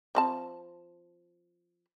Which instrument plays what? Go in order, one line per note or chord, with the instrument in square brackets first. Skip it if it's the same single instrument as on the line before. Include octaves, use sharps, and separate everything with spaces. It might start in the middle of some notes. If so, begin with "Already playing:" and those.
[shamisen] F3 C4 A5